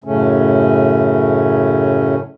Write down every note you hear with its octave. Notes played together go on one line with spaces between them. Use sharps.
F#2 A2 C#3 A3 C#4